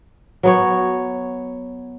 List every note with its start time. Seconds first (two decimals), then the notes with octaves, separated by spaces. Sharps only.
0.43 F#3 B3 C#5